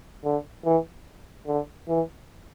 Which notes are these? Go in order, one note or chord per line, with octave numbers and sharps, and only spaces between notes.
D3
E3
D3
E3